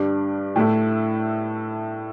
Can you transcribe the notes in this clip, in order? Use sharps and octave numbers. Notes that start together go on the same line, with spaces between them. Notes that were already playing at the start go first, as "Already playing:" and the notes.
Already playing: G2 G3 D4
A2 A3 E4